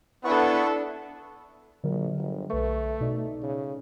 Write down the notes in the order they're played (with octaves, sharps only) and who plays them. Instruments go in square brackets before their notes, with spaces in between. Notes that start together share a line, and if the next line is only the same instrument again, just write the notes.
[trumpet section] B3 [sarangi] D4 [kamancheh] E4 A4 [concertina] B4 F#5 C#6
[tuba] A#1 [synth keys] D3 F#3 A#4
[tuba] G1
[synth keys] B1 B4 C#6 [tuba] A3
[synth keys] B2 D#4 D5
[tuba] C#3